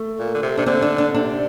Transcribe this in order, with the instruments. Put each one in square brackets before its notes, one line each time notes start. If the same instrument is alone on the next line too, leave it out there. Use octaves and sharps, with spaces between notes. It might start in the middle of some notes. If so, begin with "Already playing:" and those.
Already playing: [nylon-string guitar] A3
[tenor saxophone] A#2
D3
C3
[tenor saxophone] C3 [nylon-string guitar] D4
[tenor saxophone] D3 [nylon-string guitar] C4
[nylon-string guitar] D4
D4
[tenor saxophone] C3 [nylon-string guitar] D4